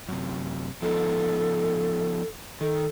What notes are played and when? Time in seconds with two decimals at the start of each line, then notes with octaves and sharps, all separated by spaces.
0.08 F#2 C3
0.82 F3 B3 D#4 A4
2.61 D#3 A4